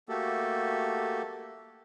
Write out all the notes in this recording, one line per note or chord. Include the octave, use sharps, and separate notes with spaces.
A3 A#3 F#4 G4 A4